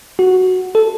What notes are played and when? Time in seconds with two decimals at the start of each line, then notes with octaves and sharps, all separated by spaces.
0.19 F#4
0.75 A4